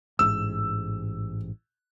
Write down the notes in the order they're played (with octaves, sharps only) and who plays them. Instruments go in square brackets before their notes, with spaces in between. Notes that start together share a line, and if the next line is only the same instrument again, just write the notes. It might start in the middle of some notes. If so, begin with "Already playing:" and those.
[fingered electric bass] A1 G#2 [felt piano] E6